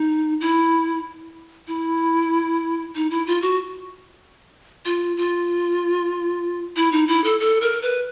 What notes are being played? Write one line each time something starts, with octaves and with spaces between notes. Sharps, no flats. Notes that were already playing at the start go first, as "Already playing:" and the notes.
Already playing: D#4
E4
E4
D#4
E4
F4
F#4
F4
F4
E4
D#4
E4
A4
A4
A#4
B4